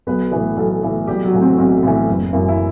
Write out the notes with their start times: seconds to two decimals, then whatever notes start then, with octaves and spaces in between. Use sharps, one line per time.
0.07 B1 B3 B4
0.31 A2 E3 B3 B4
0.57 B1 A3 A4
0.82 A2 E3
1.07 B1 G3 G4
1.24 F#3 F#4
1.33 A2 E3
1.41 C4
1.58 B1 C4
1.83 A2 E3
2.07 F#1
2.33 F#2 E3
2.48 E4